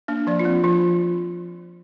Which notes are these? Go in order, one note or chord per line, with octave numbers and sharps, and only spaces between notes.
A#3 D4
F3 D5
F4
C4
F3 F4